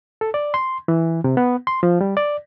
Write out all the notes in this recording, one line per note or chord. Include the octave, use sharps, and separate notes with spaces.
A4
D5
C6
E3
C3
B3
C6
F3
G3
D5